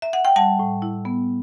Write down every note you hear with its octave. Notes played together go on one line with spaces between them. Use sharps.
E5
F#5
G5
G3 F#5 A5
A2
E4
B3